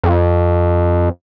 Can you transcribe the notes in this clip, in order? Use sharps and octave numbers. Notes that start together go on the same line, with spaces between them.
F2